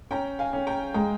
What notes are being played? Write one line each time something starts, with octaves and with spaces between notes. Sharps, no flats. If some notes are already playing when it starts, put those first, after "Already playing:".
C#4 G5 A#5
F5 G#5
C#4
G5 A#5
G#3 G5 A#5